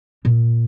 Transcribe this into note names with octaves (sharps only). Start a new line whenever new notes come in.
A#2